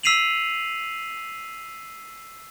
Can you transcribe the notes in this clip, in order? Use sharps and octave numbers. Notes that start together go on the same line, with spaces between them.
E6 B6 C7 D#7 F7 F#7